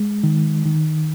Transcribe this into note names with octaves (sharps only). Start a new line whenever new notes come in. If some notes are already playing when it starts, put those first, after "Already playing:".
Already playing: G#3
D#3
D#3